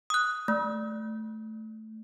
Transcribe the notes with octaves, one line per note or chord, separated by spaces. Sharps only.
D#6 F#6
A3